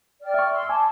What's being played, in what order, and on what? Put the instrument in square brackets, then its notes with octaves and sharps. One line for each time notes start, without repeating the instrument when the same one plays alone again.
[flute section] D5 G5 F6
[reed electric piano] E5 C#6
[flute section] C6 E6
[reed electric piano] G#5 [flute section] A5 D6